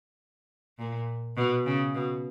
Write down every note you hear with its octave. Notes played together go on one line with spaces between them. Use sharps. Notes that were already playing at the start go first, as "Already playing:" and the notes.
A#2
B2
C#3
B2